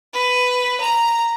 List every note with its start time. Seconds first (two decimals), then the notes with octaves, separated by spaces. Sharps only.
0.14 B4
0.81 A#5